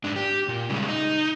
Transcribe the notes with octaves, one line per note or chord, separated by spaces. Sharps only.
G#2 D4
G4
A#2
C#3 G3 G#3
D#4